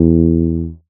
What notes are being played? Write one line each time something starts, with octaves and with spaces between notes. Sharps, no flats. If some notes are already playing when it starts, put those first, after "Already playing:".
Already playing: E2